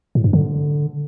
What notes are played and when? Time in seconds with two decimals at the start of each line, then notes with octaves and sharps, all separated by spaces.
0.15 A2
0.24 G2
0.33 D3